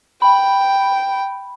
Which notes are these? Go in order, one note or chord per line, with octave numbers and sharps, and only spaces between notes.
G5 B5